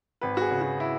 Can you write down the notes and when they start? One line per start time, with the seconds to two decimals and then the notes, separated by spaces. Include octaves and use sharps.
0.21 G#1 B4
0.37 F#4
0.41 G#4
0.51 C#3
0.61 F#4
0.80 E4